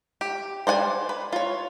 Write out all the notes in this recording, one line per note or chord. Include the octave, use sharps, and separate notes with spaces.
G4
C5 D5 F#5 G#5
B4
F4 C#5